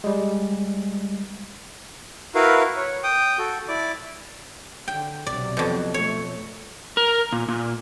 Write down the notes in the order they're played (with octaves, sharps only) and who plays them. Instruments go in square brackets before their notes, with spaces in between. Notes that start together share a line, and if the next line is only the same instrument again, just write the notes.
[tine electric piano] G3 G#3
[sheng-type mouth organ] E4 F#4 A#4 B4 F5
C#5
G5 D#6
F#4 A4
E4 D5 D6
[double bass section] D3 [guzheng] G5
[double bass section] B1 C3 F#3 [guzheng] D5
[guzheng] F2 B2
[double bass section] A3 [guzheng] C#5
[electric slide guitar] A#4
A#2
A#2